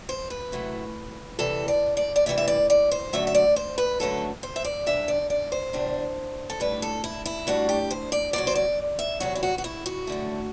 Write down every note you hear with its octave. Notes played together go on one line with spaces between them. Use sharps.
C5
B4
C3 F#3 A3 E4
D2 C3 E3 G3 A4
D5
D5
D5
D2 C3 E3 G3 E5
E5
D5
D5
C5
F#2 D3 F#3 A3 E5
E5
D5
C5
B4
F#2 D3 F#3 A3 A4
C5
E5
D5
E2 C3 G3 D4 E5
D5
D5
C5
E2 C3 G3 D4
A4
A2 G3 D4 B4
A4
E4
E4
A2 G3 D4 F#4
G4
C5
D5
E2 C3 F#3 D5
C5
D5
E5
E2 C3 F#3 F#4
E4
F#4
F#4
E4
F#4
F#2 D3 A3